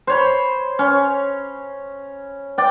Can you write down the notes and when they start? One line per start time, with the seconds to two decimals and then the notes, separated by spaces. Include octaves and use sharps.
0.07 C5 C#5 B5
0.79 C#4
2.58 D5 G5